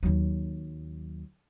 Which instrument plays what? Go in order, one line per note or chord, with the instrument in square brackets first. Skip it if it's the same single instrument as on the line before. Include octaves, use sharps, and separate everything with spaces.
[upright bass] D#2 F#3